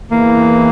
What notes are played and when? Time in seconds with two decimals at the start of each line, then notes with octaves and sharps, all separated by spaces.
0.10 E2 E3 A#3